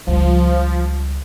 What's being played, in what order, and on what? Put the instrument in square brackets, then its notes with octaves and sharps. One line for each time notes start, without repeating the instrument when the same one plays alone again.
[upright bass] C#2 G3 [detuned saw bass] F3